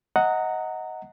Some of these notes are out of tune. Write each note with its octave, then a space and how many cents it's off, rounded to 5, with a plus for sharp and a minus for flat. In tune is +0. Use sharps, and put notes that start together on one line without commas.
D#5 +15 F#5 +0 A#5 -20